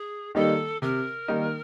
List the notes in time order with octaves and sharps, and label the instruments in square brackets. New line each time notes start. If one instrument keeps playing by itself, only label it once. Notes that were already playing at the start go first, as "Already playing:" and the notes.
Already playing: [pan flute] G#4
[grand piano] D#3 G3 A#3 D#4 [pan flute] A4
[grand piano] C3 [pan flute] A#4
[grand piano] D#3 G3 A#3 D#4